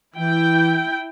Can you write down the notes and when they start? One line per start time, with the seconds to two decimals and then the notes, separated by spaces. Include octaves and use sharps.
0.16 E3 E4 G5